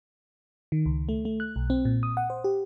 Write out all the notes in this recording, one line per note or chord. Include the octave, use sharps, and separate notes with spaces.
D#3
C#2
A3
A3
F#6
B1
C4
A#2
D#6
F#5
C5
G4